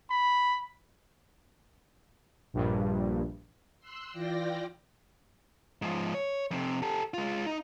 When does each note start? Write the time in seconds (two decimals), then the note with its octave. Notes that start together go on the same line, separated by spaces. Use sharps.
0.10 B5
2.54 A#1 G2
3.79 C6 E6 F#6
4.12 E3 F4 D5 G5 A#6
5.82 G#2 F3
6.14 C#5
6.51 F2 C3
6.82 G4 A4
7.14 G#3 F4
7.46 D#4